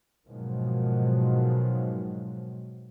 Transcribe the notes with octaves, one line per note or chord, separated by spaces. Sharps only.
G#2 B2 D#3 F3 F#3 G#3